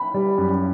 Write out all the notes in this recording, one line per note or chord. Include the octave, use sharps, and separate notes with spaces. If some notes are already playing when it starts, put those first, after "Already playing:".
Already playing: B5
G3
F#2